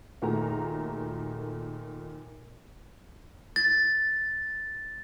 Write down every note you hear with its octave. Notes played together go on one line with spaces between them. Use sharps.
D#2 A#2 A3 F#4 G#4 A#5
A6